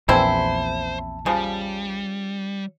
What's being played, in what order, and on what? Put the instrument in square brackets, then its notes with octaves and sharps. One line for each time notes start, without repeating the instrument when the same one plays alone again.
[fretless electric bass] A#1 E2 A#2 [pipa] E3 C4 E4 [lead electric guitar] C5 [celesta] A5
[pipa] C#3 F3 [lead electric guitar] G3